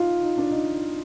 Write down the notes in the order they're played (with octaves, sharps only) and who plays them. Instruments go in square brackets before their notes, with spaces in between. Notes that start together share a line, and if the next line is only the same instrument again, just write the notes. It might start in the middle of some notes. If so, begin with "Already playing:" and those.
Already playing: [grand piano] D#4 F4
D#4
D4
D#4